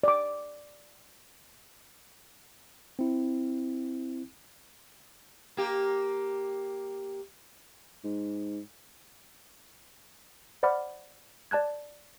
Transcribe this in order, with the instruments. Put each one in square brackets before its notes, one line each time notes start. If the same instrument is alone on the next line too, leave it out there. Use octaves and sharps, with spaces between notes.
[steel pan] D5 D6
[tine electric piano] C4 E4
[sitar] A#3 G4
[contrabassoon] G#2
[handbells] C5 D5 F#5 B5 D6 F6
D5 A5 F#6 G#6